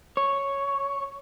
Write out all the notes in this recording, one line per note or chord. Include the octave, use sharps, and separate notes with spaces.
C#5